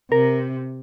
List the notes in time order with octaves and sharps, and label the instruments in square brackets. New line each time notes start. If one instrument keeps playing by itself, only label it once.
[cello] C3 [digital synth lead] A#4